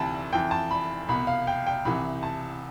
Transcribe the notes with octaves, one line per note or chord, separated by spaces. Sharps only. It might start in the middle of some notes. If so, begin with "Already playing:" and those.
Already playing: D2 C3 E3 A5 B5
F2 E3 G5
A5
B5
C2 B2 B5
F5
G5
G5
C2 C3 E3 B5
A5